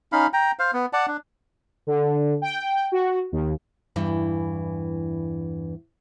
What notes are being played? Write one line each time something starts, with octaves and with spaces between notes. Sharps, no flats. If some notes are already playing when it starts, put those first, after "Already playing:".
C#4 D#4 F5 B5
G5 A#5
C5 F5
B3
D5 F#5 A5
D4
D3
G5
F#4
D#2
E2 G2 E3